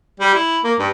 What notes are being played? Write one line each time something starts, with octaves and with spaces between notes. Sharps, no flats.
G3
E4
A#3
G2